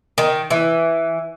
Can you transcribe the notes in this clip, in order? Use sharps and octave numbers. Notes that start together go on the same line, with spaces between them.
D#3
E3